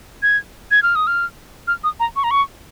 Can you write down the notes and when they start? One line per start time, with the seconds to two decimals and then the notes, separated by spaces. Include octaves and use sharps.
0.22 G#6
0.71 G#6
0.83 F6
0.95 D#6
1.07 F6
1.67 F6
1.84 D#6
2.00 A#5
2.16 C#6
2.24 A#5
2.31 C#6